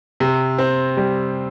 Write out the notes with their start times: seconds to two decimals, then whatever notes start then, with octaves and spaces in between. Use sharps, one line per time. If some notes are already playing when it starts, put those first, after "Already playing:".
0.20 C3
0.58 C4
0.97 G3